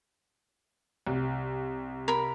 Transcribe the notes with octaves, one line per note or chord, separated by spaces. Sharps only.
C2
A#4 B5